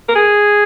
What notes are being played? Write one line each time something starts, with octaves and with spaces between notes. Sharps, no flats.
A#4
G#4